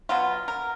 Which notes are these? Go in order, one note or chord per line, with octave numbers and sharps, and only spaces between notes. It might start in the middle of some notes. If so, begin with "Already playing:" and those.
B2 F#3 B3 F4
A#4